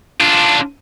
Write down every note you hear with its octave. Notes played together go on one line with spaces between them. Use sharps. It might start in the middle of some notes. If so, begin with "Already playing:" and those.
D4 F4